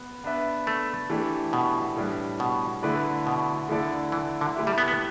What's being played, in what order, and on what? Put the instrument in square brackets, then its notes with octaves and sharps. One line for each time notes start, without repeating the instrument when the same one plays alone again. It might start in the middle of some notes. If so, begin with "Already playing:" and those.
Already playing: [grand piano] B3
B3 D4 B4 E5
[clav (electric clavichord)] A3
[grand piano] E3 A3 D4 G4
[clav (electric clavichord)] B2
[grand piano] A2 G3 D4 B4
[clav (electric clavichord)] B2
[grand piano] D3 A3 E4 B4 D5
[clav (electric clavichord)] B2
[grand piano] D3 A3 E4 A4 D5
[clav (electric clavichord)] E3
D3
[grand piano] A3 E4 G4 E5
[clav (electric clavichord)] G3
B3
B3